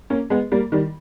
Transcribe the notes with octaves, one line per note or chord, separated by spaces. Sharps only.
A#3 C#4
G#3 B3
G3 A#3
D#3 G3